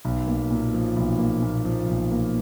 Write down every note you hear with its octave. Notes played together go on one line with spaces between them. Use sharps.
B1
A#3
A#2
F3
B1
A#3
A#2
F3
B1
A#3